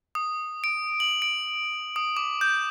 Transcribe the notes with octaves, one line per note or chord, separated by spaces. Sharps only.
D#6
D7
F#7
D7
D#6
D6
G6